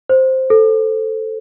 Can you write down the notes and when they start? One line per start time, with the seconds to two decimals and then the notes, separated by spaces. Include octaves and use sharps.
0.09 C5
0.50 A4